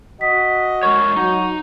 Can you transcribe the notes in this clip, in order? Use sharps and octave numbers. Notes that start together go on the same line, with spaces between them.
F#4 D#5 B6
G#3 A#4 C#5 C#6
F#3 D#4 F#4